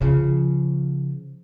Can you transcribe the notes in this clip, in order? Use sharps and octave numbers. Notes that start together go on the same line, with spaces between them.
C#3 F3